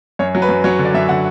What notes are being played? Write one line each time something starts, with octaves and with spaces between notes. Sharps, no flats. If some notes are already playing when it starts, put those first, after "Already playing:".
F#2 C#5
F#3
B4
F#2
F#3 C#5
D3
D5
F#2 E5
D3 F#5